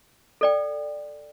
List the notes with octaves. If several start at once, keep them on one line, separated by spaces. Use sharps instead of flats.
A4 D5 G5